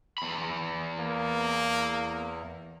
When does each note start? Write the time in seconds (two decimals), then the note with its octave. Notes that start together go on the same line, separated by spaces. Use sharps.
0.18 E2 B5
1.00 A#3